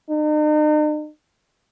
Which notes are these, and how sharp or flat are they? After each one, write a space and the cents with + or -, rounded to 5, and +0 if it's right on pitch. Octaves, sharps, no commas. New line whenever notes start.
D#4 -45